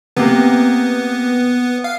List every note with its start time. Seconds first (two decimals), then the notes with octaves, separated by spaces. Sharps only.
0.17 C3 A#3 B3
1.84 F5